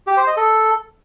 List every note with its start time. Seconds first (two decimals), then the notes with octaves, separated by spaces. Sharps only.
0.07 G4
0.17 C5
0.27 D#5
0.37 A4